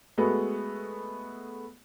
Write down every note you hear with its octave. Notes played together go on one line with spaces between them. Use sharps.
G#3 A3 B3 F#4